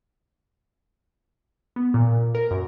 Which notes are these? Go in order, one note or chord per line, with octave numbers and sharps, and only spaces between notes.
B3
A#2
A#4
F#2